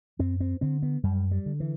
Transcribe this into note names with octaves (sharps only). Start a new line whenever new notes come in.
F#2 C4
C4
D3 C4
B3
F#2 G3
G3
D3
E3